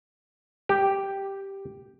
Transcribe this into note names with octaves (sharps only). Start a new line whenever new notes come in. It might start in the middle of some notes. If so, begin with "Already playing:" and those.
G4